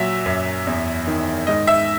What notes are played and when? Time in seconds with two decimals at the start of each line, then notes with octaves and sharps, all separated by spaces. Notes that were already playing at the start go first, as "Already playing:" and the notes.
Already playing: A#2 F#3 E5
0.26 F#2
0.67 E2
1.07 D#3
1.47 G#2 D#5
1.67 E5